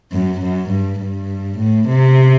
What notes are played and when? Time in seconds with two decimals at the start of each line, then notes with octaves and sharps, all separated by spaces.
0.12 F#2
0.41 F#2
0.70 G2
1.00 G2
1.59 A2
1.88 C3